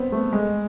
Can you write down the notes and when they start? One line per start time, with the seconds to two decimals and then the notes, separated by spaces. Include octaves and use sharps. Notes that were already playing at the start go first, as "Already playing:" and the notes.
Already playing: B3 C4
0.12 A3
0.33 G#3